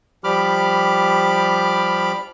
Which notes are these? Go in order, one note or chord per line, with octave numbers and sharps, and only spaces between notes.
F3 G3 G4 B5 D6 F6